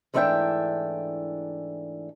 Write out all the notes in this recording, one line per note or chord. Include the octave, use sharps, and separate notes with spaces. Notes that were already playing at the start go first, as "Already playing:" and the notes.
G#2 E3 A3 D4 E5 G5